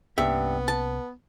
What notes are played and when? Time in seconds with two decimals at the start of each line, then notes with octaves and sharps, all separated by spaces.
0.18 C2 G2 A#3 B3 C#4 E5
0.68 A5